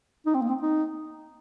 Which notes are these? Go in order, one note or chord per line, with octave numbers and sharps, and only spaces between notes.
D#4
C4
A#3
C4
D#4